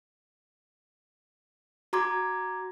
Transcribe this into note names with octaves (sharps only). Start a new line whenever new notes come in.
F#4 A#5 C6 D6 G#6